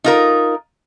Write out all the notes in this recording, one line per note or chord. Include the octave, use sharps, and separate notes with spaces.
D#4 F4 A#4